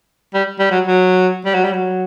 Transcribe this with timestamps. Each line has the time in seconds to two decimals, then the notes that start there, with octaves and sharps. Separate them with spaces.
0.34 G3
0.59 G3
0.71 F#3
0.87 F#3
1.45 G3
1.54 F#3
1.64 G3
1.73 F#3